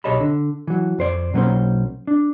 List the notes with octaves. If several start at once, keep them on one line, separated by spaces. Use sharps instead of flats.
B1 G4 C#5 D#5 A5 B5
D3
E3 F#3
F2 C5 D5
B1 F#3 A#3 C4 C#4 C5
D4